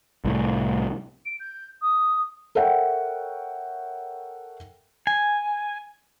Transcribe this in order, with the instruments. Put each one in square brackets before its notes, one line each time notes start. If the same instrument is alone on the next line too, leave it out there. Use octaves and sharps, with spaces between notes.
[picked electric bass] C2 A2
[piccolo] D7
G6
D#6
[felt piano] A4 A#4 C#5 E5 F#5 G5
[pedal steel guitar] G#5